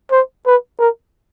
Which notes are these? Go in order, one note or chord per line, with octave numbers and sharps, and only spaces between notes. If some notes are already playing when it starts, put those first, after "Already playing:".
C5
B4
A#4